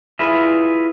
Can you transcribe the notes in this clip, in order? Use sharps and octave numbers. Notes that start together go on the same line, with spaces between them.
E4 F4 G#4 B4 E5